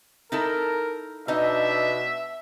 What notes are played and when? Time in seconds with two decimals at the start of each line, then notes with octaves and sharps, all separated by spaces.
0.32 D#4 E4 A4 A#4
1.28 B2 D4 D#4 D#5 E5